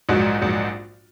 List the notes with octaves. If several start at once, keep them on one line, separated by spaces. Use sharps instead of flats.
A#1 G#2 F#3 D#4 F#4
A#1 G#2 F#3